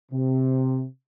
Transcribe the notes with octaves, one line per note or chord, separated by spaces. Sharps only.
C3